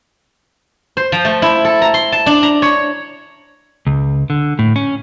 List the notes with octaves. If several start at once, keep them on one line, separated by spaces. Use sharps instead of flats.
C5
F3
A3
E4
A4
A#5
C6
A5
D4
A#5
C#5
C#2
D3
A2
C#4